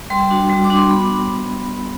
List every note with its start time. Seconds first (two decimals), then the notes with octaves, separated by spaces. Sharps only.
0.10 G3 C6
0.31 D4 F#4
0.50 G3
0.64 D6
0.70 D4 F#4
0.77 C6
0.89 B3 B5